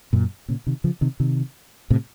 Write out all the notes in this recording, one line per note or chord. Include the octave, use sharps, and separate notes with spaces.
F#2 A#2
A#2 C#3
C3 D#3
C#3 F3
C3 D#3
C3 D#3
A2 C3